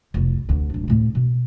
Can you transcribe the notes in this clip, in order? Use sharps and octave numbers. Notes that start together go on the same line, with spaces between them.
F1 C2
D2 D3
D1 D4
D2 A2
B2